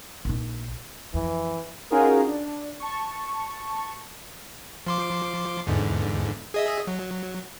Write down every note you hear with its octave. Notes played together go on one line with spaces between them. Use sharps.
A#1 D#4
F2 E3
C#4 D#4 F4 F#4 G#4 A#4
D4
A5 C#6
F3 C6 D6
E2 G#2 D3
G#4 D#5 E5
F#3